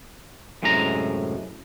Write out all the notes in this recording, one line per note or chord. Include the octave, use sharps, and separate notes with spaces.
F#2 A2 C3 G#3 G4 A#5